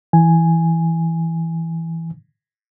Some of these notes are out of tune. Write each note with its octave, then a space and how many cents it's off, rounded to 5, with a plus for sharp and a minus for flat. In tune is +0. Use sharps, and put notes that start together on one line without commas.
E3 +0 G#5 +0